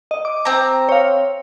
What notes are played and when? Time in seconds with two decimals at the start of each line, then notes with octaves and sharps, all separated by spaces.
0.11 D#5
0.25 D6
0.45 C4 A#5
0.89 C#5 F5